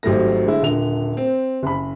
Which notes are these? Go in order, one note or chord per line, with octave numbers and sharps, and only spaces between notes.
G#1 F#3 G3 A3 A#6
D3 G#3 E4
D#1 D3 F7
C4
F#1 B5